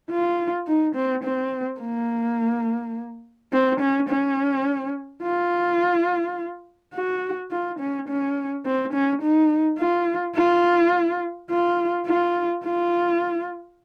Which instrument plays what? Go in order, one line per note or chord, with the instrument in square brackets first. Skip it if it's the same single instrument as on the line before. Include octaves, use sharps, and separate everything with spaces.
[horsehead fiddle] F4
D#4
C4
C4
A#3
C4
C#4
C#4
F4
F#4
F4
C#4
C#4
C4
C#4
D#4
F4
F4
F4
F4
F4